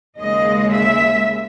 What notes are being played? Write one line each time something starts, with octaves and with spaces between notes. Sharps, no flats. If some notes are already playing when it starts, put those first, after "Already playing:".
D#2 C#3 G#3 D#5
E5